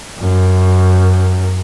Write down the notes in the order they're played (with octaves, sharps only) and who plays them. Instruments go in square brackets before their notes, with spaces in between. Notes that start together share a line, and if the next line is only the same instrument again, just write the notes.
[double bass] F#2